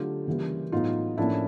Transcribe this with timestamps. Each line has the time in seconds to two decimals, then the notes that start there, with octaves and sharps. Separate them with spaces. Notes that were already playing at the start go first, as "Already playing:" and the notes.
Already playing: D3 F#3 A3 F4 G4
0.27 C#3 E3 G3 A#3
0.72 A2 F#3 B3 D#4 F4
1.17 A2 F3 A#3 C#4 D4 E4